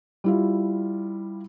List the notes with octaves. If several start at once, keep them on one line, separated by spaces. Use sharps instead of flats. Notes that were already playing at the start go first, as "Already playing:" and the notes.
G3 E4 F4